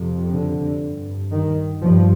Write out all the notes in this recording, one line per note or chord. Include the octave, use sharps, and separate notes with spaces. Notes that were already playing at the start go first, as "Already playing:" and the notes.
Already playing: F2 C3
D3
G2
D#3
G2 F3